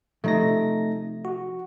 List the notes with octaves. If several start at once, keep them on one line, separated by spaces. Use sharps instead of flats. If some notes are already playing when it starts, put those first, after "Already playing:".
C3 F3 A3 D#4 A#6
F#4